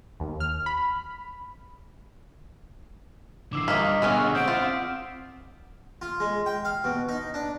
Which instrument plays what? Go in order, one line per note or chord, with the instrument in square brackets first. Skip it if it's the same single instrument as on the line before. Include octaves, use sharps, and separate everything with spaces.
[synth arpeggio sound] D#2
F6
B5
[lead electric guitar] D3 E3 [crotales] D6 E6 C7
[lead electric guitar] G2 [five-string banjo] D#3 A#3 [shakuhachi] D#5 [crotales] D#6 F6 B6
[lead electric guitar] B2 D3 [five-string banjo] G#3 B3 C#4
[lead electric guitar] C4 [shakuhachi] F#5 [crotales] G6 D7
[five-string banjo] F4
[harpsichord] F4
G#3
G5
F5
B2
D#4
D4